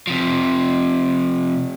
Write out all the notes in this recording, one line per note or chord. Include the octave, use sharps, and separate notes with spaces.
C3 F3